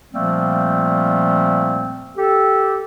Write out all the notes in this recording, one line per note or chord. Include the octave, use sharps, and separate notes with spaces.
A#2 F3 G3 A3 A#3 C4
G4 A4